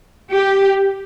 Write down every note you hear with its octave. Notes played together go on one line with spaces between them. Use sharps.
G4